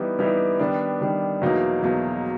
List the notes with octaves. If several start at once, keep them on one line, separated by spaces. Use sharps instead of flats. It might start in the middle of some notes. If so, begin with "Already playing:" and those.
Already playing: E3 G3 B3 D#4 G4
E3 G3 B3 D#4 G4
D#3 G3 B3 D4
D#3 G3 B3 D4
E2 B2 F#3 A#3 D#4
E2 B2 F#3 A#3 D#4